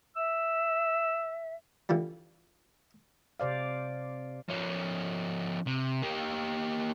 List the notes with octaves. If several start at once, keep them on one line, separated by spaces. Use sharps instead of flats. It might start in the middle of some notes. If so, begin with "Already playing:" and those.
E5 E6
D3 E3 F3 G3
C3 C5 D5 F5
F3 C#4
C3
A#3 G4